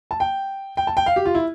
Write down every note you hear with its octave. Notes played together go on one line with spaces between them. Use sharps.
A5
G5
G5
A5
G5
F5
G4
F4
E4